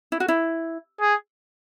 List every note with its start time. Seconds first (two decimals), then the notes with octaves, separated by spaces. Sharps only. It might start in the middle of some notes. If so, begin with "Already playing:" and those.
0.12 E4
0.20 F#4
0.28 E4
1.01 G#4